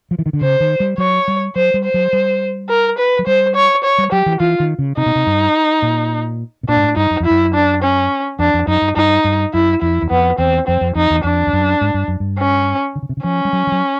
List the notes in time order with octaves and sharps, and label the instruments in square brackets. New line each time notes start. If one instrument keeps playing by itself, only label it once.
[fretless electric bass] F3
E3
D#3
D3
[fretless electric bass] C#3 [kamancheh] C5
[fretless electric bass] D#3
G3
[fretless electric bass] F#3 [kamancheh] C#5
[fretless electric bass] G3
[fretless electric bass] F#3 [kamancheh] C5
[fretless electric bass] G3
[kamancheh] C5
[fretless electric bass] F#3
G3
[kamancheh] A#4
B4
[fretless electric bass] F#3
[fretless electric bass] G3 [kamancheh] C5
[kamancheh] C#5
C#5
[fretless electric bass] G3
[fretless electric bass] F#3 [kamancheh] G4
[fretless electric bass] E3
[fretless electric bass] E3 [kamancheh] F4
[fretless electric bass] D#3
C#3
[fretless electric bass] C3 [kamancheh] D#4
[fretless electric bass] B2
C3
G2
A#2
B2
[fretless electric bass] A#2 [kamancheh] D4
[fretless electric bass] G#2
A2
[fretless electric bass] G2 [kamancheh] D#4
[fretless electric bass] F#2
F2
[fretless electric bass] F#2 [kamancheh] E4
[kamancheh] D4
C#4
[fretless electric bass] F2 [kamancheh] D4
[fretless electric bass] F2
[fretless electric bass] F#2 [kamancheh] D#4
[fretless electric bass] G2
[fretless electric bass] G2 [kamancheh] D#4
[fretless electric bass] G2
[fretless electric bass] F#2 [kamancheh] E4
[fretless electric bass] F2 [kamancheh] E4
[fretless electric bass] E2
[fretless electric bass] F2 [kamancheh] B3
[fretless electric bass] E2 [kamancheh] C4
[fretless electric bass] F2 [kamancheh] C4
[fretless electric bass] F2
[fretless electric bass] F2 [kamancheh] D#4
[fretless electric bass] E2
[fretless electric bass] F2 [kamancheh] D4
[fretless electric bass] F2
F#2
G#2
G2
F#2
G2
[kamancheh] C#4
[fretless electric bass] D3
C#3
C3
C#3
[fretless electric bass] F3 [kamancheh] C#4
[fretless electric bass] G3
F#3
F3
F#3